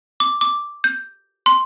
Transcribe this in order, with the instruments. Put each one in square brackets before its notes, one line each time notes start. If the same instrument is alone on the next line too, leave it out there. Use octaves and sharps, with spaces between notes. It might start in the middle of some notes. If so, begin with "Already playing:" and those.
[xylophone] D6
D6
G6
C6